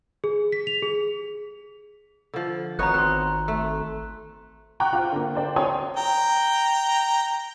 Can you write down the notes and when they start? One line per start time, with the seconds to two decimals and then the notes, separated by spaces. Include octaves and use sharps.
0.24 G#4
0.52 B6
0.67 F7
0.82 G#4
2.34 D3 F3
2.79 G#1 B3 D#4 C#5 A#5 F#6
2.94 C4 C6 F#6
3.48 A3
4.80 F#5 G5 A#5 C#6 D6 F#6
4.93 F4 C5
5.12 D3 A#3
5.35 C5 D5 G5
5.56 C#5 G5 G#5 C6 D#6
5.97 G5 A#5